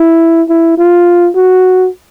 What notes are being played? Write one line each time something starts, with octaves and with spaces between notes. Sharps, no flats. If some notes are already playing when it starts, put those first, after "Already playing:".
Already playing: E4
E4
F4
F#4